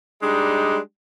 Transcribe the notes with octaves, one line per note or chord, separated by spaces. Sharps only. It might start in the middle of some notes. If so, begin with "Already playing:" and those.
G3 G#3 D4 D#4